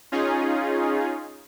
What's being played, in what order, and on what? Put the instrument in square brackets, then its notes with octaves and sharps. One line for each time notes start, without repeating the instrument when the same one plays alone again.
[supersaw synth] C#4 D#4 F4 G#4